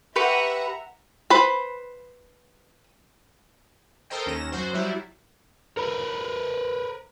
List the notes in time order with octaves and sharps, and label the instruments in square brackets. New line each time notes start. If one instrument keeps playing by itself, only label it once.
[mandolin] G4 B4 C#6 [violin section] E5 F#5 A#5
[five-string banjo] B4 C5 B5
[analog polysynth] A4 A#4 C5 D#5 G5
D#2 C#4 A#6 E7
F#2 F#4 C5
F#3 G3 E4
[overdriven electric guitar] A#4 B4